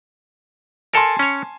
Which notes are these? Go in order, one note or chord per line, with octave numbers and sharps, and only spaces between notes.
A4 A#4 G#5 A5 C6
C#4 C#5